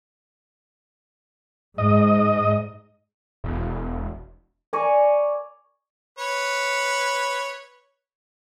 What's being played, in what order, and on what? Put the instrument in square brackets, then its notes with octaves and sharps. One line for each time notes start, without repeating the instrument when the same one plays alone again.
[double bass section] G#2 [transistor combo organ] D#5
[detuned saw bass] E1
[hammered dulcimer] D5 G#5 A#5 C#6
[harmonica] B4 C#5